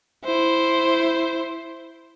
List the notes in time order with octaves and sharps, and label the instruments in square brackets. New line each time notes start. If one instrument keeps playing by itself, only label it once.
[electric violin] E4 C5